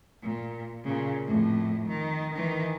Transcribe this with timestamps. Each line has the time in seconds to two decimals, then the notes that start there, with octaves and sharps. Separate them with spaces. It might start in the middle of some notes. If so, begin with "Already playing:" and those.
0.22 A#2
0.84 A#2 C#3
1.25 F2 A2
1.89 D#3
2.34 D#3 E3